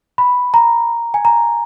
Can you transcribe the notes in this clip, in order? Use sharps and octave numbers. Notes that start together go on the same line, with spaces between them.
B5
A#5
G#5
A#5